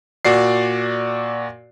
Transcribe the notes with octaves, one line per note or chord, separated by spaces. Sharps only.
A#2 F#4 D5 C7